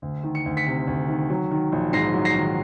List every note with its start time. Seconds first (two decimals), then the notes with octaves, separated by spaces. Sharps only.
0.02 D2
0.24 D#3
0.35 C#7
0.45 D2
0.57 B6 C#7
0.66 C3
0.87 D2
1.09 D#3
1.30 F#3
1.51 D#3
1.72 A#1
1.93 G#2 A#6 C7
2.14 F#3
2.25 A#6 C7
2.36 D#3